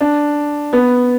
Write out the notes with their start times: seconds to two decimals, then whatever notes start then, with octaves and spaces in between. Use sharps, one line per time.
0.01 D4
0.73 B3